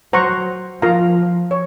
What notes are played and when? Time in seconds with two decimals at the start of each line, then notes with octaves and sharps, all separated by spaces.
0.13 F#3 C5 F#5 A#5 C#6
0.82 F3 F4 A#4 F5 A#5
1.51 C#5